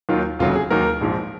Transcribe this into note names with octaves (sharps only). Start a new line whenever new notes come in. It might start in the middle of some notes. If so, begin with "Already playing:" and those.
D#2 D#3 F#3 F4
F1 D#2 C#3 F#3 F4
G#4
D#2 D#3 F#3 A#4
A#1 G#2 F3